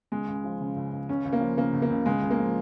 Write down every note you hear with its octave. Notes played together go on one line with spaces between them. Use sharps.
C#2 G#3
C#2
F3
C#3
C#2
C#2
C#2 C#4
C#2
A#3
F3
C#3 A#3
C#2
A#3
C#2
C#2 G#3
C#2
A#3
F3